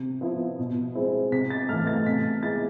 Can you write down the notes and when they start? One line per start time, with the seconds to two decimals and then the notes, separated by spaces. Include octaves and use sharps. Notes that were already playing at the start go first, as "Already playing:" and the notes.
Already playing: C3
0.21 F3 B3 E4
0.59 B2
0.95 G#3 C4 E4
1.32 C3 B6
1.50 A6
1.69 E3 A3 F6
1.87 A6
2.06 C3 B6
2.43 G#3 B3 E4 A6